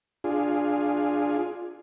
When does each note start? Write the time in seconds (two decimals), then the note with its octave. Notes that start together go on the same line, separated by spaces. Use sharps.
0.24 D4 F4 G#4